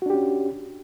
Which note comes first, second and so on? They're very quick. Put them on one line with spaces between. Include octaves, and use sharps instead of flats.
F#4 D4 G4 C#4